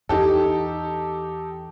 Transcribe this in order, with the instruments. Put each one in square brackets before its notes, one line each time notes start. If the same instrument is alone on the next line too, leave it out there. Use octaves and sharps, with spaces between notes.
[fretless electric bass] E2 C#4 [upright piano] D#4 G4 A4